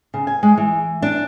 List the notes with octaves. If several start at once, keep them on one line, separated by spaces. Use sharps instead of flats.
C#3
G#5
G#3
E3
D4